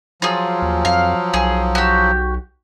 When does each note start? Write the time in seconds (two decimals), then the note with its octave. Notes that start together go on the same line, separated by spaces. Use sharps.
0.22 F3 F#3 F4 G#4
0.62 D#2
0.85 F2 F5
1.34 B1 G#4
1.75 F#4 G4